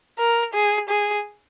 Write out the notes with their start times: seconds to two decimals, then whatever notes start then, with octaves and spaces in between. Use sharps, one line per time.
0.19 A#4
0.54 G#4
0.89 G#4